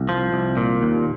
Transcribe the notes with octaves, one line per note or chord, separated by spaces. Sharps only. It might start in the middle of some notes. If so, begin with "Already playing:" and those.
Already playing: C2
F3
C2
A#2
D#2